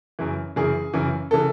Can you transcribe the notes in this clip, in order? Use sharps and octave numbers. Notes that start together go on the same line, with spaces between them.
F#2 C#3 E3
F#2 C#3 E3 G#4
F#2 C#3 E3
C#3 E3 A4